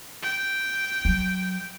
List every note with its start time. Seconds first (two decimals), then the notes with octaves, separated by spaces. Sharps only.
0.22 G5
1.05 F#3